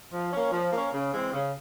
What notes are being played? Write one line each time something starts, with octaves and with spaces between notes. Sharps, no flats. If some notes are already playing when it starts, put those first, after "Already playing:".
F3
A#3 C#4
F3
A#3 C#4
C#3
E3 G#3 C4
C#3